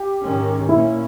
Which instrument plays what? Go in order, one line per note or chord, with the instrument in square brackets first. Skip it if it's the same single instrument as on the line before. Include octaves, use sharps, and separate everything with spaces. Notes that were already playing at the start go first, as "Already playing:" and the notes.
Already playing: [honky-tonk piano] G4
[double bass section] G#2 D#3 G#3 C#4
[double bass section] A#2 A#3 C#4 [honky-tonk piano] E4